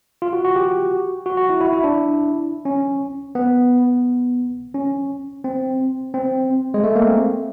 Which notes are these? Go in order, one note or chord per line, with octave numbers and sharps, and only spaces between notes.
F4
F#4
F#4
G4
F#4
F#4
E4
E4
E4
D4
C#4
B3
C#4
C4
C4
G#3
A3
A#3
C4